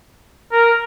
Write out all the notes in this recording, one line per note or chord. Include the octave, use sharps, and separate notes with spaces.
A#4